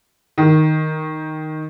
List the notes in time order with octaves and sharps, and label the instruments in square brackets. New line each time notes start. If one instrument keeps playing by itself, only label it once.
[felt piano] D#3